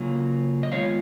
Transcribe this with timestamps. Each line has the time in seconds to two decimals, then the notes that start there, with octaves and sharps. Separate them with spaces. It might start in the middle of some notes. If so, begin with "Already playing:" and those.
Already playing: C#3 F#3 A#3 F4
0.63 D#5
0.72 D#3 G#3 B3 F4 C#5 F5